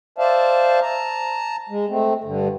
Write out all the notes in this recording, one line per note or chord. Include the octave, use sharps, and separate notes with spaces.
C5 D5 E5 F5 A5
A5 A#5
G#3
A3 C4
G2 D3